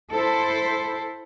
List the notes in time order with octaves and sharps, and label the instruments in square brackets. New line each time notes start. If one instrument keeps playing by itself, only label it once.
[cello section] E4 A4 C5